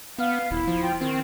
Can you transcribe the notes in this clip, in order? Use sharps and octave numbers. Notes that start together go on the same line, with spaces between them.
B3 F5
D#1 E4
F3
F4 G5
D#3 C4